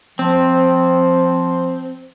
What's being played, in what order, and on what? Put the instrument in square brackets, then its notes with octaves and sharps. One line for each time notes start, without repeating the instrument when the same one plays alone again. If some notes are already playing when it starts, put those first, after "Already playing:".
[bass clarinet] F3 [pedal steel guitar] C4